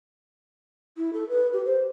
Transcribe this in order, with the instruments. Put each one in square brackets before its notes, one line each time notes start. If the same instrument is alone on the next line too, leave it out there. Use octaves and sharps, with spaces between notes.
[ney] E4
A4
B4
G4
C5